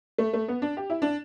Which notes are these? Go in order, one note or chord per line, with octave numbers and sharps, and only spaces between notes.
A3
A3
B3
D4
G4
E4
D4